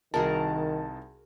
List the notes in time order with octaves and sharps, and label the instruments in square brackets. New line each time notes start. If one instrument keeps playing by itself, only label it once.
[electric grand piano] C2 D#4 A5 [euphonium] D#3 [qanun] F#4 G#4 A#4